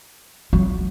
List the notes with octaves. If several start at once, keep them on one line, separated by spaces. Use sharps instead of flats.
F#3